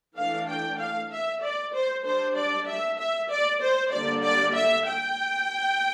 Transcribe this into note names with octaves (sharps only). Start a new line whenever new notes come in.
E3 A3 D4 F5
G5
F5
E5
D5
C5
G3 D4 C5
D5
E5
E5
D5
C5
D3 G3 A#3 D5
D5
E5
G5